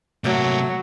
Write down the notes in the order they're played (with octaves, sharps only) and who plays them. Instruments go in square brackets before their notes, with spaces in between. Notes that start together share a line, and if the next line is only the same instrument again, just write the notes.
[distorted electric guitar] C3 A#3 [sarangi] F#3 [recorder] A3